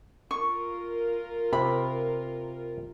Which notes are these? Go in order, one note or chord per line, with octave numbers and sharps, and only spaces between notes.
F4 A#4 C#6
C3 B5